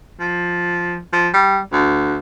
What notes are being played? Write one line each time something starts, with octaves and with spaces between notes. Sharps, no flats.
F3
F3
G3
D2